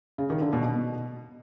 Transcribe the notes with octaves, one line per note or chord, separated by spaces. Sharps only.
C#3
D#3
D3
B2
B2